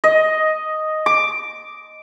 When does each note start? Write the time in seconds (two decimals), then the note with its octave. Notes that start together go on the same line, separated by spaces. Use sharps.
0.04 D#5
1.06 D6